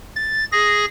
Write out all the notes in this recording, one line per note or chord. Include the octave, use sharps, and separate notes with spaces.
A6
G#4 A#6